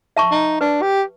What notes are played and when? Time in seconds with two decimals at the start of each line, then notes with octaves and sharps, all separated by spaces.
0.17 E5 A5 C#6
0.31 D#4
0.61 D4 B4
0.82 G4